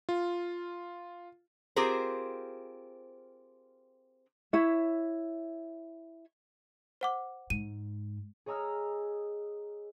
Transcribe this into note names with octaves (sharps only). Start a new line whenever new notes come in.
F4
C4 F4 G4 G#4 A#4 C5
E4 C#5 E5
C5 F#5 D6
G#2 D#7
G#4 C#5 D#5 A#5 E6 F6